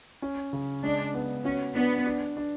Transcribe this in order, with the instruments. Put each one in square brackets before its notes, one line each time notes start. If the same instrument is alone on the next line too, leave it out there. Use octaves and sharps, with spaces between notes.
[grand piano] C#4
C#3
[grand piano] G#3 [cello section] D4
[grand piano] B3
[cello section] C#4 [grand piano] F#4
[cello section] B3 [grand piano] D4
[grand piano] D4
D4